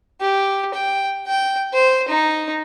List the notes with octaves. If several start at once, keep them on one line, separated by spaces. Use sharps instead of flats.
G4
G5
G5
C5
D#4